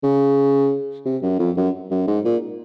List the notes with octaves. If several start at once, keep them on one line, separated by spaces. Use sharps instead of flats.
C#3
C3
F#2
F2
F#2
F#2
G#2
A#2